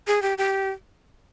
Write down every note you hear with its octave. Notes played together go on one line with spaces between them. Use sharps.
G#4
G4
G4